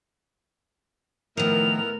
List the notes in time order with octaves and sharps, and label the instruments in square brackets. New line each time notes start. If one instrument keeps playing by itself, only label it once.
[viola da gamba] A2 [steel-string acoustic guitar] D#3 F3 [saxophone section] B3 E4 A#4 [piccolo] F7